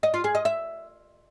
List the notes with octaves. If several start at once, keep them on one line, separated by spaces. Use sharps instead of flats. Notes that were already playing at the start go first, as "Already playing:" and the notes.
D#5
F4
G#4
D#5
E5